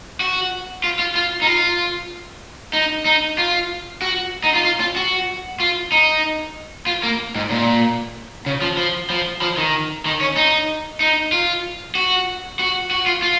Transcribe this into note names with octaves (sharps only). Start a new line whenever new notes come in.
F#4
F4
F4
F4
D#4
F4
D#4
D#4
F4
F#4
D#4
F4
F4
F4
F#4
F4
D#4
F4
A#3
G#2
A#2
C#3
F3
F3
F3
F3
D#3
D#3
C#4
D#4
D#4
F4
F#4
F#4
F#4
F4
F4